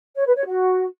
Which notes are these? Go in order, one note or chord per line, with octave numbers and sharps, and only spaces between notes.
C#5
B4
C#5
F#4